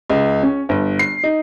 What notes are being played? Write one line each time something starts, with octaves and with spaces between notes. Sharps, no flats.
C#2
C#4
G1
C7
D#4